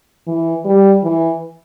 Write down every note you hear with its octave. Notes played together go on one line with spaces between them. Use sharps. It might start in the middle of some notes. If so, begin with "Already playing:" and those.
E3
G3
E3